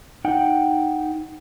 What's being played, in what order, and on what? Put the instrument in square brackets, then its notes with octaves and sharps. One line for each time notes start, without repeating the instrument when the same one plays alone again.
[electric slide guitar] D#4 F#5 G5